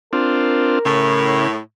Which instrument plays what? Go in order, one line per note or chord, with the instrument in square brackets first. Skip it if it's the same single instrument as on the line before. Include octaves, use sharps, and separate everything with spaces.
[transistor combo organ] C4 D4 F4 [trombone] A#4
[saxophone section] A2 [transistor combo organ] C#3